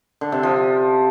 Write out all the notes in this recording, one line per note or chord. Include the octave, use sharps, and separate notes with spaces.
D3
C3
F3